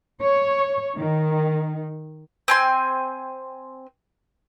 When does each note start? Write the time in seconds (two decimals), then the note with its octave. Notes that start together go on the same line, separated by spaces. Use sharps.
0.21 C#5
0.96 D#3
2.48 C4 G#5 C6